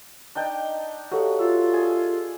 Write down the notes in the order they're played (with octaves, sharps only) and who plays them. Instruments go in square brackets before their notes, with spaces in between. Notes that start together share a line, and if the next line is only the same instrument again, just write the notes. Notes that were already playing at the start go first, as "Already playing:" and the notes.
[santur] D4 D#4 G5
[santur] F#3 [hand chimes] G4 A4 F5
[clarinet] F4 [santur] E5
[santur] G#4